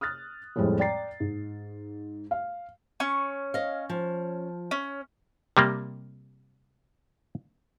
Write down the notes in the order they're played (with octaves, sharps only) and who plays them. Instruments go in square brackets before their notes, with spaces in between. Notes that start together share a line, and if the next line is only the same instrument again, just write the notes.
[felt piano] D#6 F6 F#6 A6
F2 A2 G3 G#3 C4
D5 G5 A#5 A6 C7
G#2
F5
[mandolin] C#4 C#6
[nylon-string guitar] D#5 F5
F3
[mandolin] C#4
[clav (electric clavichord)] C3 G3 A#3